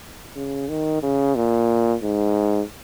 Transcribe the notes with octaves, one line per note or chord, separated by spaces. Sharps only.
C#3
D#3
C#3
A#2
G#2